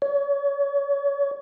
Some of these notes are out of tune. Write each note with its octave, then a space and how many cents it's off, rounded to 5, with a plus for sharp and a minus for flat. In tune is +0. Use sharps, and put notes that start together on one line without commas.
C#5 +35